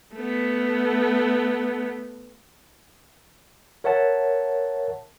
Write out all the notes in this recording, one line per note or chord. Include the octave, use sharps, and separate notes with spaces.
A3 B3
A#4 C#5 E5 F#5 A5